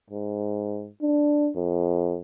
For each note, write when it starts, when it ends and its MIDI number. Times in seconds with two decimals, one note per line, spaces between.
0.10 0.89 44
1.02 1.50 62
1.56 2.20 41